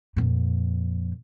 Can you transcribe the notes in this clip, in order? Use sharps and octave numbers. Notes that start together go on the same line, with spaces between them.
F2 A#2